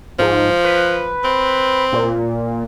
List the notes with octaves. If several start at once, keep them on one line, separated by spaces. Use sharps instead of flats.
G#2 F3
B4
C4
A#2